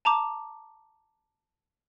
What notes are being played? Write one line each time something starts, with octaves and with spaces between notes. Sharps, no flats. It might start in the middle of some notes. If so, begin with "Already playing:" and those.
A5 A#5 D6